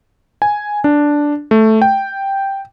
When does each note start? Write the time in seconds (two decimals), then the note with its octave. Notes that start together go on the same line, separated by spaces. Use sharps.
0.42 G#5
0.84 D4
1.51 A3
1.82 G5